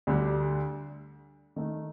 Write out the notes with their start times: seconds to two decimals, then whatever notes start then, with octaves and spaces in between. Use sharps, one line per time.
0.07 D2 D3 G3 D4
1.56 D#3 A3 D#4